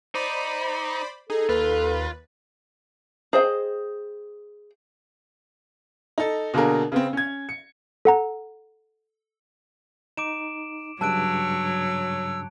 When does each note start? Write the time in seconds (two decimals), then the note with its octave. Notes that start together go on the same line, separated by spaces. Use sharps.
0.15 D#4 C5 D5 B5
1.30 D#4 G#4 A4
1.49 D#2 F4 B4
3.33 G#4 C5 D#5 F#5 G5
6.18 D#4 A4
6.54 B2 D3 A#3 D4 G#4 A#4
6.92 C#3 B3 C4
7.13 C#4 G#6
7.49 C#7
8.05 A4 F#5 A#5
10.17 D#4 D6 D7 E7
11.01 G2 C#3 F#3 C#5 A5 E6 F#6 D7